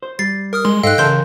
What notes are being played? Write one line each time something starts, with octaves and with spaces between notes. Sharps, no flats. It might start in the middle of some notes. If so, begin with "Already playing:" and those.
C5
G3 A6 C7
A#4 D#6 F6
G#3 C6
G#2 A4 D#5 F5 G5 F#6
C#3 E3 A#4 A5 C6 G6